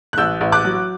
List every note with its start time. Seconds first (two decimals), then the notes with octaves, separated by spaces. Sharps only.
0.13 F#6
0.18 A1 E6 G6
0.41 A1
0.52 D6 F#6
0.64 F#3